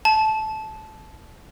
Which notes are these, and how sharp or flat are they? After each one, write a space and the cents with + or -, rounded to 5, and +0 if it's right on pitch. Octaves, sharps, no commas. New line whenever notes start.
A5 -15